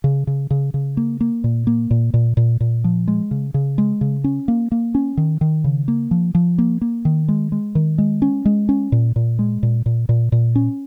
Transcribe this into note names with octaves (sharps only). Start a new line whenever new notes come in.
C#3
C#3
C#3
C#3
A#3
A#3
A#2
A#3
A#2
A#2
A#2
A#2
F3
G#3
C#3
C#3
G#3
C#3
C#4
A#3
A#3
C#4
D#3
D#3
C#3
A#3
F3
F3
A#3
A#3
D#3
G#3
G#3
D#3
G#3
C#4
G#3
C#4
A#2
A#2
G#3
A#2
A#2
A#2
A#2
C#4